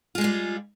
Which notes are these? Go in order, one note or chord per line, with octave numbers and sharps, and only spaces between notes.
G3 G#3 F4 G#4